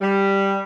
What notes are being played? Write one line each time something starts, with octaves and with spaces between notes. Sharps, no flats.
G3